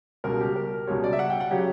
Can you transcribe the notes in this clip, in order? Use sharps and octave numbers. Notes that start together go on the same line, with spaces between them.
C#2 B2 G3 A#4
G4
A#4
C#2 B2 G3 C#5
D5
E5
F#5
G5
F#5
C#3 F#3 G4